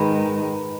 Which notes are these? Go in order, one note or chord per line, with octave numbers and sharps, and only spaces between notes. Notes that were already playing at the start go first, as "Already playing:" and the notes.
Already playing: G#2 D#3 G#3 B4 B5